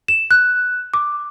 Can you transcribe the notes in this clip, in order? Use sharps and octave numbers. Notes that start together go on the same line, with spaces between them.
E7
F#6
D6